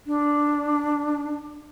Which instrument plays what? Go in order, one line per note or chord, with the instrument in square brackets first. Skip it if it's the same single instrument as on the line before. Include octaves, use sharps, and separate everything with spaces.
[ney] D4